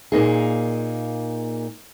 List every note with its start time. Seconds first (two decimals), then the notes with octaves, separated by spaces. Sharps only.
0.12 A#2 A#3 D#4 G#4